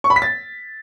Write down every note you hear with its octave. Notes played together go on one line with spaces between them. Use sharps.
C#6
B5
B6
A6